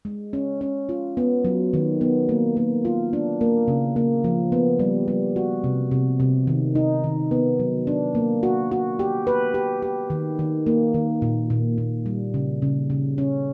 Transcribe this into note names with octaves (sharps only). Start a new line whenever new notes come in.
G#3
C#4
C#4
F4
B3
F#3
D#3
B3
A#3
A#3
F4
D4
A#3
C#3
A#3
F3
B3
G3
G3
F#4
C3
C3
C3
D#3
D#4
D#3
B3
F#3
D4
A#3
F#4
F#4
G4
B4
G4
G4
D#3
D#3
A#3
D#3
A#2
A#2
A#2
G3
C#3
C#3
C#3
C#4